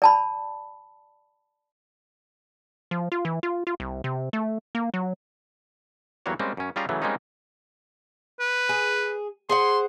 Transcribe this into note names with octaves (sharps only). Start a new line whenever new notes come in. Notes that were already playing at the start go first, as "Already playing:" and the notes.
D5 A5 B5
F3
F4
E3
F4
F4
C2
C3
A3
A#3
F#3
E2 F#3 G3 A#3 F#4 C#5
G3 G#3 A#3 C4 C#4
F#2 C#4
G3 C#4 F4 G4 G#4 A#5
C#3 E3 F#3 A3
G3 G#3 A#3 C4 C#4 D#4
B4
G#4
G#4 C5 F#5 C6